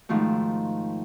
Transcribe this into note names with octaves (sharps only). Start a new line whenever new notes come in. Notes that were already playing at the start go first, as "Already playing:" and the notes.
G#2 D#3 F3 A3